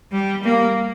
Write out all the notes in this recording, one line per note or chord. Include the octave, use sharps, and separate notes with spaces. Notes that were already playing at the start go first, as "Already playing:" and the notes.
G3
A#3